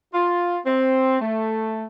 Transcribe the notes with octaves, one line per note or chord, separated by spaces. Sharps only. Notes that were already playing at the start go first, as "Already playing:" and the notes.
F4
C4
A3